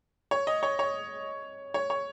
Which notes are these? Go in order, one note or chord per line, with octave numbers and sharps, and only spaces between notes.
C#5
D#5
C#5
C#5
C#5
C#5